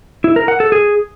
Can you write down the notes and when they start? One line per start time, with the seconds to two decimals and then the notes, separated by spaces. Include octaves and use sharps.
0.24 E4
0.36 A#4
0.48 F#5
0.60 A4
0.72 G#4